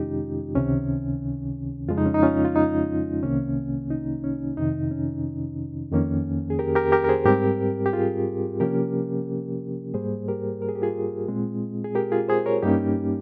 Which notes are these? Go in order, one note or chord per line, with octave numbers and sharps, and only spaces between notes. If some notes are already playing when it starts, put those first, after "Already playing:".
Already playing: F2 C3 D#3 G#3 C#4 D#4 F4 G4
C#2 C3 D#3 C#4
F2 C#3 F3 G#3 F4
D#4
C#4
D#4
C#4 F4
F4
D#4
C2 C3 D#3 A#3 C#4
D#4
C#4
F2 C3 D#3 D#4
C#4
F2 D#3 A#3 C#4
G#4
G4 A#4
G4 A#4
G4 A#4
A#4
G#4 C5
G#2 G3 C4 G4 A#4
G4
F4 G#4
C3 F3 A#3 C#4 G4 A#4
G#2 G3 A#3 G#4 C5
G4 A#4
A#4
G#4
G4
F4 G#4
A#2 G#3 C4
G#4
G4 A#4
F4 G#4
G#4 C5
A#4 C#5
G2 G3 A#3 C#4 D#4 G4